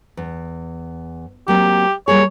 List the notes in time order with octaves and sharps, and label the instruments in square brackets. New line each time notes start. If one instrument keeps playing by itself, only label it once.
[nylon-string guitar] E2
[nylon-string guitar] F#3 A#3 C4 [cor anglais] G4
[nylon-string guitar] G3 A#3 G#4 [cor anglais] C#5